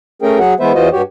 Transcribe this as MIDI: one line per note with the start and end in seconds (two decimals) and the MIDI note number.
0.22 0.39 57
0.22 0.39 61
0.22 0.39 68
0.22 0.39 70
0.22 0.39 79
0.39 0.54 54
0.39 0.54 66
0.39 0.54 68
0.39 0.54 73
0.39 0.54 78
0.60 0.72 52
0.60 0.72 56
0.60 0.72 59
0.60 0.72 71
0.60 0.72 72
0.60 0.72 76
0.74 0.89 40
0.74 0.89 52
0.74 0.89 65
0.74 0.89 66
0.74 0.89 72
0.74 0.89 75
0.92 1.02 43
0.92 1.02 66
0.92 1.02 67
0.92 1.02 73